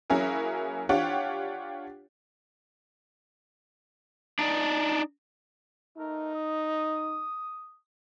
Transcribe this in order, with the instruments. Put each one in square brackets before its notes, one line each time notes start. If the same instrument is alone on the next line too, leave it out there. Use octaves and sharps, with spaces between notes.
[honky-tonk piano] F#3 A#3 C#4 E4 G#4 A#4
D4 F4 G4 C#5 F#5 G5
[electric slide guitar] D4 D#4 D5
[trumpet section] A3 A#4 [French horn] D#4
[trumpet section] D#6